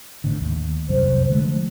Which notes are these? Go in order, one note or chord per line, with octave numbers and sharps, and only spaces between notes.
G#1 A2 D3
D#2
F1 C2 F#2 C5
D3 G#3 A3
F3